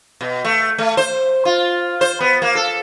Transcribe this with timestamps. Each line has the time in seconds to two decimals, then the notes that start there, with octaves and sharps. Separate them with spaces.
0.21 B2
0.44 A3
0.78 A3
0.97 C5
1.45 F4
2.01 C5
2.20 B3
2.42 A#3
2.55 A4